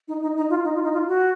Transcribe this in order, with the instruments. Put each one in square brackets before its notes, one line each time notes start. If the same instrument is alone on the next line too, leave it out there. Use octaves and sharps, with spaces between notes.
[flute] D#4
D#4
D#4
F4
D#4
F4
D#4
F4
F#4